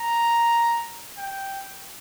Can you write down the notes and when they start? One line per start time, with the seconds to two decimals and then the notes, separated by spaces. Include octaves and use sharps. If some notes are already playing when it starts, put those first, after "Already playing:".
Already playing: A#5
1.18 G5